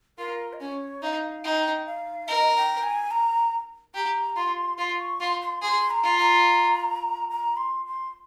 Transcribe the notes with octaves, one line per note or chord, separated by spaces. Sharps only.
F4 A#4
D#5
C#4 C#5
D#4 F5
D#4 G5
F5
A#4 D#5
G5
G#5
A#5
G4 A#5
F4 C6
F4 C6
C#6
F4 C6
C6
G#4 C6
A#5
F4
A#5
A#5
C6
C6